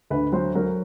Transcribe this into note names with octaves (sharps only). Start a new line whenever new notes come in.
D2 B4
F#3 C5
F#3 A#4